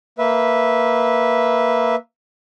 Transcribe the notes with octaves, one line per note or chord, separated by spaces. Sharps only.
A#3 B4 E5